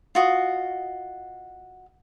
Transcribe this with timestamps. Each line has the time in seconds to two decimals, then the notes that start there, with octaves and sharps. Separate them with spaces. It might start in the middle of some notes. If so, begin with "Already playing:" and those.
0.15 F4 F#4 D#5